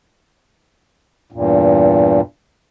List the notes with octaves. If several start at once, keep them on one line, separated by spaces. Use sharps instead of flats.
E2 G2 A#2